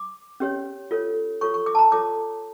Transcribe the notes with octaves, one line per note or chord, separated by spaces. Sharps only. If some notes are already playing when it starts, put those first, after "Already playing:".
Already playing: D6
C#4 G4 C#5
F4 A4 C#5
F4 A4 C#5 C#6
C#6
D6
A5
A#5
F4 A4 C#5 D6